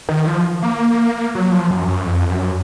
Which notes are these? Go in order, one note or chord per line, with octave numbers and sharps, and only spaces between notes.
D#3
F3
A#3
F#3
F3
F#2
F#2
F2
F#2